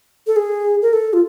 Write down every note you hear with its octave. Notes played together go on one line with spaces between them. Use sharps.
A4
G#4
A#4
A4
F4